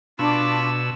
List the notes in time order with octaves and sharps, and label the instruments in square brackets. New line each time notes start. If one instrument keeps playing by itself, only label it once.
[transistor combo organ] B2 E6 [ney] D4 [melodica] F4 B5 C#6 [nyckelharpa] A5 D6